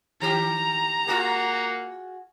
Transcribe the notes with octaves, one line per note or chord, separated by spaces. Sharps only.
D#3 G4 A#5
A#3 F4 F#4 G#4 F#5